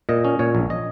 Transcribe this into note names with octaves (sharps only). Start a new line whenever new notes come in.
A#2 D#5
C#4
A#2 C#5
A#1
D#5